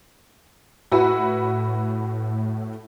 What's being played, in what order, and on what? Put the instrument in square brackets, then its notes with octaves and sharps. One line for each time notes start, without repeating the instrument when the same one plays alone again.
[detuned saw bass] A2 [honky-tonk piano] E4 F#4 B4